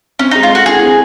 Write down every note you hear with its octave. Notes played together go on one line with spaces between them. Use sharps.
C4 C#4
D#4
G#3
F4
F#4 A4
E4 G#4
C4